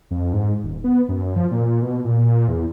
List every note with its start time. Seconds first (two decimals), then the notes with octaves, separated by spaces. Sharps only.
0.11 F2
0.33 G#2
0.64 D#1
0.84 B3
1.09 F#2
1.36 F3
1.51 A#2
1.82 B2
2.05 A#2
2.48 E2